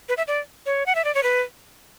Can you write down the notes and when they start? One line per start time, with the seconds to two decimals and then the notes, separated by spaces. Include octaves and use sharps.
0.09 B4
0.17 E5
0.28 D5
0.66 C#5
0.86 F#5
0.95 E5
1.05 D5
1.15 C#5
1.23 B4